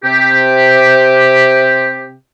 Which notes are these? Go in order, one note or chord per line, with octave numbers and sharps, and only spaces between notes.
C3 G4